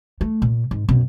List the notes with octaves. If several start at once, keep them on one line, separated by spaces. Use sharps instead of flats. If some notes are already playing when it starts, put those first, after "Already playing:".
A3
A#2
G#2
F#2 B2